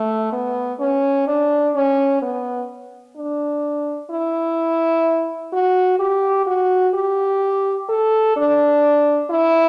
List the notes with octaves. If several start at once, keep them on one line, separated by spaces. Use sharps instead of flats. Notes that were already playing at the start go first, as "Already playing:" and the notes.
Already playing: A3
B3
C#4
D4
C#4
B3
D4
E4
F#4
G4
F#4
G4
A4
D4
E4